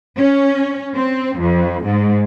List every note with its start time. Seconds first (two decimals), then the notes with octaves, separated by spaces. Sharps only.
0.18 C#4
0.94 C4
1.40 F2
1.85 G#2